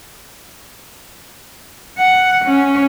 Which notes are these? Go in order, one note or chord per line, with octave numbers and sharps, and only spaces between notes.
F#5
C#4